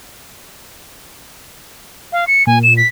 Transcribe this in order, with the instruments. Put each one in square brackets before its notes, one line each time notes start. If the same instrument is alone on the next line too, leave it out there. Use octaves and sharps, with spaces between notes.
[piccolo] F5
C#7
[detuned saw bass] A#2 [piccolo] G#5
[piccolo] E7
B6